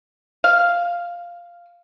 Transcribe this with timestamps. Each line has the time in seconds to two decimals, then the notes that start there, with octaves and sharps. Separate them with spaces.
0.44 F5